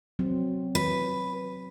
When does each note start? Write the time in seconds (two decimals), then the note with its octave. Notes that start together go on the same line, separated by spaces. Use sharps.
0.19 F#3 C4
0.75 B4